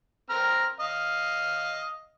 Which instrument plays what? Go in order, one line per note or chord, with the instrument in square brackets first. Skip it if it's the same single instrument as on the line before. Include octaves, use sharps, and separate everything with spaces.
[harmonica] C4 A#5 F6
D#5 F5